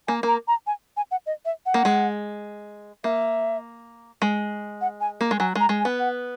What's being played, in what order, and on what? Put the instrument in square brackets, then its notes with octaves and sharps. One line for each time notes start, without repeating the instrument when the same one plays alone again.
[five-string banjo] A#3 [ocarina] G#5
[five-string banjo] A#3 [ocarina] A#5
[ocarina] A#5
G#5
G#5
F#5
D#5
E5
F#5
[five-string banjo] A#3
G#3
[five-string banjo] A#3 [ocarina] E5
[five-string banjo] G#3
[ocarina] F#5
G#5
[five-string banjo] A#3
G#3
[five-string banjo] F#3 [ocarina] G#5
[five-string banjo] G#3
[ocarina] A#5
[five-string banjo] G#3
[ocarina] G#5
[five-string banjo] B3
[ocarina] F#5